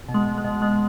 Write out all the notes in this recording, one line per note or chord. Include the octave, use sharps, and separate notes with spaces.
B2
G#3
B2
G#3
B2
B2 G#3